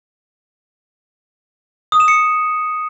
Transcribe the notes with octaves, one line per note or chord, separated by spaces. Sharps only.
D#6
E7
C#7